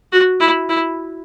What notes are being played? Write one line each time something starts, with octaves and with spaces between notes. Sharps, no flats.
F#4
E4
E4